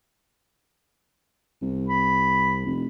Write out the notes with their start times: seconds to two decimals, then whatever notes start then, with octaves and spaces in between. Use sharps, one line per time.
1.62 C2
1.88 B5
2.66 F1